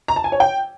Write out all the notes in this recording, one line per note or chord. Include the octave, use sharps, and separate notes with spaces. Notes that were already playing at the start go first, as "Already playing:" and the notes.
A#5
A5
G#5
C#5
G5